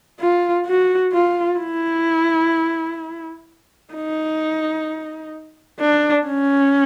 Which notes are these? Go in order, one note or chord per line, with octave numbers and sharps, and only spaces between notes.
F4
F#4
F4
E4
D#4
D4
C#4